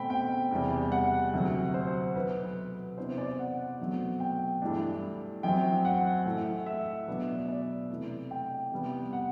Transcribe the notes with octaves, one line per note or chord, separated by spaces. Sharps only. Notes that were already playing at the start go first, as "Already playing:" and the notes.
Already playing: B2 A3 C4 G5 B5
G5
E2 C3 G3
F#5
D2 C3 F#3
C5
B2 F#3 B3 B4
C3 E3 B3 D4 C5
D5
F#5
B2 F#3 A3 C4
G5
G2 E3 A3 D4
F#2 F#3 C4 G5
F#5
A2 E3 A3
E5
B2 F#3 B3 D4
D5
C3 E3 A3
G5
C3 G3 B3
F#5